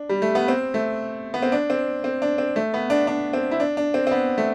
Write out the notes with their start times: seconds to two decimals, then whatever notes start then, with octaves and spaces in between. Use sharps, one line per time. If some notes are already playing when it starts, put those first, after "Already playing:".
Already playing: D4
0.09 G3
0.22 A3
0.35 B3
0.48 C4
0.74 A3
1.34 B3
1.42 C4
1.52 D4
1.70 C4
2.04 C4
2.22 D4
2.38 C4
2.56 A3
2.74 B3
2.90 D4
3.07 D4
3.33 C4
3.51 E4
3.60 D4
3.77 D4
3.94 C4
4.07 C4
4.11 B3
4.38 A3